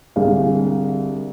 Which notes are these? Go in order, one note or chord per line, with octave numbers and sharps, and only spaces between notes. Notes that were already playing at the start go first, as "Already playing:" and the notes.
C2 D3 G#4 F5